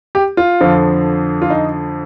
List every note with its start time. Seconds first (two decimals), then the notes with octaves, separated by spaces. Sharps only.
0.15 G4
0.37 F4
0.61 F2 D3 F3
1.42 F4
1.50 D#4